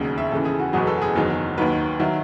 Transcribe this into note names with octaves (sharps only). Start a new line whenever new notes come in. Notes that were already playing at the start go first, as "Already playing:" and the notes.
Already playing: E1 D#2 C#3 F#3
E5
D#2 C#3 E3 A4
G#4
F#4
F#1 E2 B2 F#3 G#4
B4
A4
G#4
F#1 E2 D#3 F#3
D#2 D#3 F#3 B4
D#3 F#3 E5